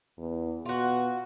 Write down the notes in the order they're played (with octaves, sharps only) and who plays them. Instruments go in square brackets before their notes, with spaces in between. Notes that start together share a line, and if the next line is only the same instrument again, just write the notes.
[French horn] E2
[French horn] B2 [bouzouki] F4 F#4